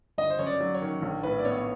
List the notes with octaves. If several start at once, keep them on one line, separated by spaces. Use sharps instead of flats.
G1 D#5
C5
F#2 C#5
D5
F#3
C#5
D#3
A#1
A2 B4
D5
B3 C#5